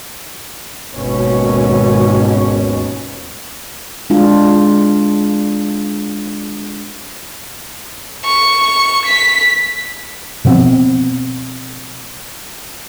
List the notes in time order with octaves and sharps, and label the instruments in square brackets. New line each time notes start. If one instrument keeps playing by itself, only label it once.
[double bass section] G#1 D#2 B2 C#4
[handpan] G#3 D4 F4
[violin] C#6
B6
[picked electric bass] B2 F3 B3 C4